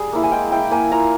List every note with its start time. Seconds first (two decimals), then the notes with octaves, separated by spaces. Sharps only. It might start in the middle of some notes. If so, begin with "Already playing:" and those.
Already playing: G3 G#4
0.12 A#3 E4
0.23 G#5
0.32 G#3 G5
0.52 E4 G5
0.71 A#3 G#5
0.91 F4 A#5